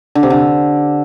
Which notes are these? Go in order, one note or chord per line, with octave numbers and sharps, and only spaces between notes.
D3
C3
D3